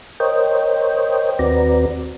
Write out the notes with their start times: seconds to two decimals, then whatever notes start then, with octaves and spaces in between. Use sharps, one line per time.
0.20 A#4 C5 C#5 D#5 G5
1.39 D#2 C4 F#4 B4 D5 A#5